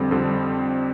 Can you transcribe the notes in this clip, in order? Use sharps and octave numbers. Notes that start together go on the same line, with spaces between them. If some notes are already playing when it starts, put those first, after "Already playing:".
Already playing: F2 D3 G3 C4
F2 D3 G3 C4